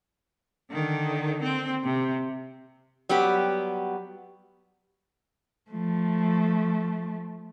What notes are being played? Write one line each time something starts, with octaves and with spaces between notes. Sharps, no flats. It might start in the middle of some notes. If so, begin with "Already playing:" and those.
D3 D#3
C4
C3
F#3 G3 B3 G4
F3 A3